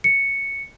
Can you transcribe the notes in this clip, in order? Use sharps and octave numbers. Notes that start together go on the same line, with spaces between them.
C#7